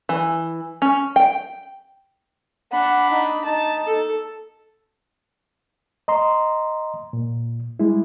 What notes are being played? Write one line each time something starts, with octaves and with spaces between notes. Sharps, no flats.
E3
C#4
G5
D4 F#5 B5
D#4
D#4 A5
A4
D#5 A#5 C6
A#2
G3 G#3 E4